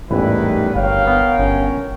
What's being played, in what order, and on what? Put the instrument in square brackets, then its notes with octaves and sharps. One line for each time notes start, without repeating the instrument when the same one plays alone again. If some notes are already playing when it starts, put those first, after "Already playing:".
[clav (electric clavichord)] A1 E2 [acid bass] G#2 [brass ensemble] D#3 G3 B4 [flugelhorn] E4
[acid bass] G1 [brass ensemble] A#4 C#5 G5 [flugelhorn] F5
[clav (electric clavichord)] B3 B4
[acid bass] G1 [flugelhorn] C#4